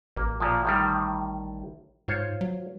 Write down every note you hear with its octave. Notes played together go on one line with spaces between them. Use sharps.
A1 A#3
A#2 F3
A2 D#3 G3
G#2 F4 C5 C#5
F#3